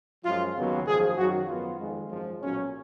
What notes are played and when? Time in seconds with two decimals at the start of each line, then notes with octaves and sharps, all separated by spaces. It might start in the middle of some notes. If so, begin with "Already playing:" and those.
0.24 F#2 F3 G#3 F4
0.56 D#2 C#3 F#3 B3
0.86 G#1 F#2 F3 G#4
1.17 F#2 D#3 F#3 F#4
1.47 G#1 F#2 F3 B3 F4
1.79 F2 D#3 G#3
2.09 G#1 F#2 F3 G#3
2.40 B1 A#2 F#3 C#4